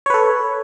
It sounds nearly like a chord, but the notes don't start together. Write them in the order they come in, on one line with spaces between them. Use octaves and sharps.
C#5 B4 A4